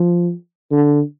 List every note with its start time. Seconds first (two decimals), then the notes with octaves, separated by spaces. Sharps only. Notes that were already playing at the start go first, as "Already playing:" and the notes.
Already playing: F3
0.71 D3